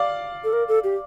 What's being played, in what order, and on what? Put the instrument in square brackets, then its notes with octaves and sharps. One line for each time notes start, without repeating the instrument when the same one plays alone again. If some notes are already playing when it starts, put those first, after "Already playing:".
Already playing: [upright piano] D5 F5
[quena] A4
A#4
A4
G4